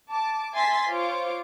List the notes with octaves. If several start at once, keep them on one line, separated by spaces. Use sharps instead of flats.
A5 D6
E5 G#5 C6 A6 B6
F4 C5 C#5 D6